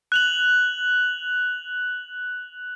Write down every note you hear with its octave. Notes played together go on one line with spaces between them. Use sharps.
F#6 F7 F#7